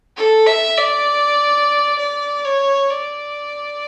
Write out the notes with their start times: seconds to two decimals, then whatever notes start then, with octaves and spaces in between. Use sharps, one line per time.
0.17 A4
0.47 E5
0.78 D5
1.98 D5
2.45 C#5
2.90 D5